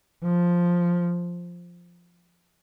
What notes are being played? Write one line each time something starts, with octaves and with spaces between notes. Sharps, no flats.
F3